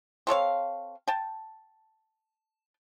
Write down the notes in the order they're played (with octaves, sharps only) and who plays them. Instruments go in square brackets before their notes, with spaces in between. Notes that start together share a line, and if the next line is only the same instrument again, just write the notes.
[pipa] C4 A4 C#5 F5
G5 A5